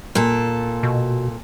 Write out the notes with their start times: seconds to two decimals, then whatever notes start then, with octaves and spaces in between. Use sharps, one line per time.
0.15 A#2 A4
0.83 B2